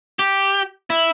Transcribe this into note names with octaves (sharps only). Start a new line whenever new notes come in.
G4
E4